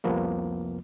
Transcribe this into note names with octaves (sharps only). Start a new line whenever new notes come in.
C2 F2 C3 F3 A#3 B3